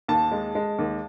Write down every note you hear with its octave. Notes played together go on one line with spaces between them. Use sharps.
D#2 A5
G#3
G#3
D#2